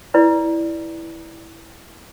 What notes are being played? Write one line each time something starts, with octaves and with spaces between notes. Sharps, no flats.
E4 B4 D5